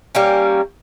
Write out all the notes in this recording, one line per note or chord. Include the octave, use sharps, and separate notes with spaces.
G3 A#3 C#4